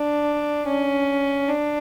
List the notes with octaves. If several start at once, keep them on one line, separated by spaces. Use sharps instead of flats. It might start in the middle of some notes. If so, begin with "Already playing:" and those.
Already playing: D4
C#4
D4